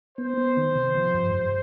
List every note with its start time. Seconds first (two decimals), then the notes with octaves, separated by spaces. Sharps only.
0.18 B3 C5
0.37 B3
0.57 D#3
0.75 C3
0.95 F3
1.14 G2
1.34 G2